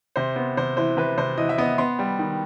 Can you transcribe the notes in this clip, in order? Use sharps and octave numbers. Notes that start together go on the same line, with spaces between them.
C3 C5
B3
C3 C5
E3 C5
C3 B4
C3 C5
E3 D#5
E5
B3 D#5
B3 C6
G3
D#3